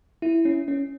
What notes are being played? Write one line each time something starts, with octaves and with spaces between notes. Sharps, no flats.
E4
C#4
C#4